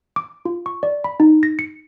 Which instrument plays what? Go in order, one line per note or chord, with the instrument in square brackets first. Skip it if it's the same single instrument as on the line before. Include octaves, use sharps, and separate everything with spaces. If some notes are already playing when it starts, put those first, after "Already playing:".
[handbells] D6
F4
C#6
D5
B5
D#4
A#6
C#7